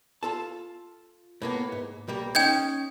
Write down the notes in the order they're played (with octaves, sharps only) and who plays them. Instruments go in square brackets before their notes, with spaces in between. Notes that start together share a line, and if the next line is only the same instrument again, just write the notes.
[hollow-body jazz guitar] F4 A4 A5
A2 A#3 B3
G#2
B1 G3 A#3
[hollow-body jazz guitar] C#4 D#4 [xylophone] G5 G6 G#6